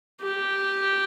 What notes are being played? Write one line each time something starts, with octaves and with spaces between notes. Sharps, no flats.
G4